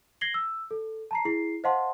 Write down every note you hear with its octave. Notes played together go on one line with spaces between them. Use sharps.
G#6 A#6 C7 F#7 G7
E6
A4
A5 A#5 C7
E4 G#4 C7
C5 D#5 F5 F#5 A5 C6